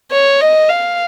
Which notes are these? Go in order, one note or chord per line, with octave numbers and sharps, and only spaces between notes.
C#5
D#5
F5